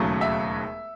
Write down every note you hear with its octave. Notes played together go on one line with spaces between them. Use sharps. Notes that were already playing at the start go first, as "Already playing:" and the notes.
Already playing: E1 D#2 C#3 F#3 A3
E5